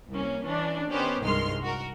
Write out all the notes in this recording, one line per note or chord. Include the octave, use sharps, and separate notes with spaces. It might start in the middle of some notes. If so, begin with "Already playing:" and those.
C2 A#3 C#4
E3 C#4 D4
D#3 B3 C#4 G4 C5
C2 G2 D#3 G#3 C6 F6
F#4 A#4